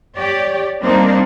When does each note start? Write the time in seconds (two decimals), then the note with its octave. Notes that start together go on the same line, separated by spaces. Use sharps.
0.15 G4 C#5 D5
0.81 G3 A#3 C4 D4 D#4